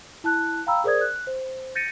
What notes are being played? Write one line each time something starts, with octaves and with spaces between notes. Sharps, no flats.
E4 A5 F#6
F5 G5 A#5 B5 E6
G#4 A#4 C5 D5 D#6 G#6
F#6
C5
G6 A6 A#6 C#7 D#7